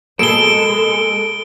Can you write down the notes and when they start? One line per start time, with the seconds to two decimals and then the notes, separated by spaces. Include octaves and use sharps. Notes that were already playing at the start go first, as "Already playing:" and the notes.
0.19 B2 G#3 A#3 G#4 A4 D7 G7